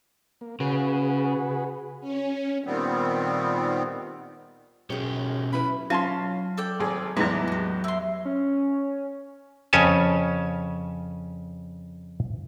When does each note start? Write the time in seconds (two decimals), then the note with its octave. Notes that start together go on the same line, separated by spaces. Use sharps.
0.41 A#3
0.60 C#3 F#4 G#4 B4
2.00 C#4
2.64 A#2 D#3 G3 B3 C4
4.90 B1 F#2 G4 G#4 C#5
5.53 C#4 E4 B4 B5
5.90 F#3 C#4 F4 A5 C6
6.57 A4 D5 G5
6.80 G#1 G#4
7.17 E2 A2 F#3 G#3 B4 A5 A#5 D6
7.48 F#4 G4
7.84 E4 C6
8.25 C#4
9.73 F2 C#3 C#4 C#5 G#5 A5